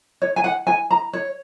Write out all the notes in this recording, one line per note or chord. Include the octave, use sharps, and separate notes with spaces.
C#5
G#5
F#5
G#5
A#5
C#5